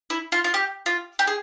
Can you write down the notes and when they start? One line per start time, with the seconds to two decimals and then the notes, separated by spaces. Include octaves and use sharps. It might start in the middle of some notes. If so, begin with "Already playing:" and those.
0.10 E4
0.32 F4
0.44 F4
0.54 G4
0.86 F4
1.19 G4
1.27 G#4